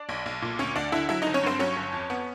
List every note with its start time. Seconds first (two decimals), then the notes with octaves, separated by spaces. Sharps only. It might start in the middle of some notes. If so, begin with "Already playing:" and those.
Already playing: D4 D5
0.09 B1
0.26 B1
0.42 A#2
0.59 D2 C#4 C#5
0.76 D2 D4 D5
0.92 D3 E4 E5
1.09 F#3 E4 E5
1.22 D#4 D#5
1.27 G1
1.34 C#4 C#5
1.43 G2 C4 C5
1.59 F#3 C#4 C#5
1.77 G1
1.93 F2
2.10 B3